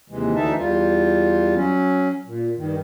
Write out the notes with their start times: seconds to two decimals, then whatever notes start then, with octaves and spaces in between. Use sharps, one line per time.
0.10 D#2 C3 E3 G#3
0.35 D2 D3 E3 D#4 E5 A5
0.58 E2 G3 F4
1.56 F#3 C#4
2.26 A#2
2.57 G2 D#3